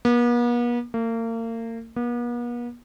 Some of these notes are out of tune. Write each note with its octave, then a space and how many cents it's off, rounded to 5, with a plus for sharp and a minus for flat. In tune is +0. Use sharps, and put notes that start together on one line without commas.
B3 -45
A#3 -35
B3 -45